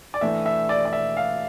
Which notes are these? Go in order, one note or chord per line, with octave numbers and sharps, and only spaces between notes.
D5
E3 A3 D4 E5
E5
D5
D5
E5
F5